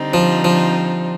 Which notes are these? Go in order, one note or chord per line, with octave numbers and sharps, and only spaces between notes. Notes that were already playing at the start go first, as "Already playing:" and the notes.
Already playing: D3 G3 C4 D#4
F3
F3